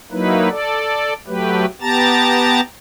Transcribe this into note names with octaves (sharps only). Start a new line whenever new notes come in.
F#3 A#3 D#4 E4 B4
A4 D5
F#3 A3 G4 B4
B3 G4 A5 A#5 A6